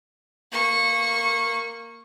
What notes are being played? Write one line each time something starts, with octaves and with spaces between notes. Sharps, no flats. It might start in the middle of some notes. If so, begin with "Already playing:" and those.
A#3 C#6